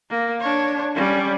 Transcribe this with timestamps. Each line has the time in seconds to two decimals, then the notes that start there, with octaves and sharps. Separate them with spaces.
0.10 A#3
0.41 D4 C#5
0.96 G3 C#4